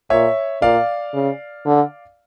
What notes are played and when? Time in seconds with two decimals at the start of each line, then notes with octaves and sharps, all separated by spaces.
0.10 A#2 C#5 E5
0.62 A#2 D5 F5
1.13 C#3
1.65 D3